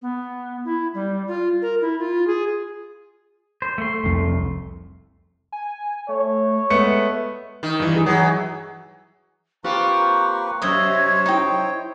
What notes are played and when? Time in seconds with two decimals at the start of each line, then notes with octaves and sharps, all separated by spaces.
0.02 B3
0.65 E4
0.94 G3
1.28 F4
1.62 A#4
1.82 E4
1.99 F4
2.27 G#4
3.62 C5
3.78 A3 C6
4.04 F1 C2 F2
5.52 G#5
6.09 A3 C#5
6.70 G#3 A3 B3 C#7
7.63 D#3
7.80 G2 E3
7.93 E4 G#4
8.06 E3 F#3
9.64 A#3 C4 F4 G4 B4 A#5 C#6
10.62 F#2 C3 C5 C#5 D#5 E5 G#6
11.26 D#4 E4 G5